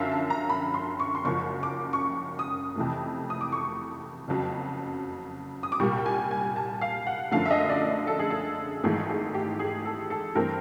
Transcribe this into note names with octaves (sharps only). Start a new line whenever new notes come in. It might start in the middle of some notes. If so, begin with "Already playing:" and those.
Already playing: F#2 D3 F3 E5 F5
A5
A#5
B5
C6
C#6
C6
F#1 F#2 C#3 F3 C#6
D6
C#6
D6
D#6
F2 C3 E3 A3
D#6
D6
C#6
F#1 F2 C#3 F#3
D#6
D6
C2 A#2 G3 C#6
G5
G#5
G#5
A5
F5
F#5
F#2 D3 F3 A3 F5
E5
D#5
D5
A4
G#4
A4
G#1 G#2 E3 A3 G#4
G#4
G4
G#4
A4
A4
G2 E3 A3 C4 A#4